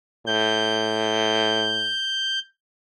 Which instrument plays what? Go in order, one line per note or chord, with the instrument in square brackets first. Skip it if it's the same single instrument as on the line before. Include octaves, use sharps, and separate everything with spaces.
[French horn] A2 [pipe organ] G6